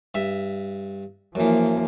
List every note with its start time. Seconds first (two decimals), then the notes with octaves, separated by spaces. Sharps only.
0.15 G2 E5
1.35 F#2 E3 F3 A#3